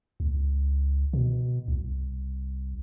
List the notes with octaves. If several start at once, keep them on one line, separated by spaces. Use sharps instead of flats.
C#2
B2
C2